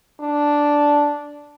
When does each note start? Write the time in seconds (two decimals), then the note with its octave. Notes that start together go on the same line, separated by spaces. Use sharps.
0.20 D4